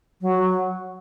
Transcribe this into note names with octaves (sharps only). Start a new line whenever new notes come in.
F#3